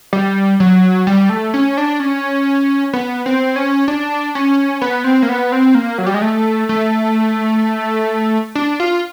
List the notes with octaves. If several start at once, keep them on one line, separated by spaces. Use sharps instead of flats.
G3
F#3
G3
A3
C#4
D4
C#4
B3
C4
C#4
D4
C#4
B3
C4
A#3
B3
C4
A#3
F#3
G3
G#3
A3
A3
D4
F4